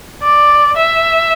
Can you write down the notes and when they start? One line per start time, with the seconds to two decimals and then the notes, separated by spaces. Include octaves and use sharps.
0.22 D5
0.77 E5